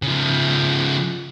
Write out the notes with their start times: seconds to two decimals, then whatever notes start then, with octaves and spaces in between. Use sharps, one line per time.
0.02 C#3 F3